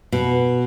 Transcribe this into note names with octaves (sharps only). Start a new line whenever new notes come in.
B2